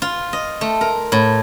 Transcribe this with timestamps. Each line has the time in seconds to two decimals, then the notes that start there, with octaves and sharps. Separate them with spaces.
0.02 F4
0.33 D#5
0.61 A3
0.81 A#4
1.12 A2